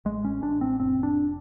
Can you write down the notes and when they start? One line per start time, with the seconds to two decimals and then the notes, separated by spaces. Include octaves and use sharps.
0.05 A1 G#3
0.25 C#4
0.42 A1 D4
0.61 C4
0.79 F1 C4
1.03 D4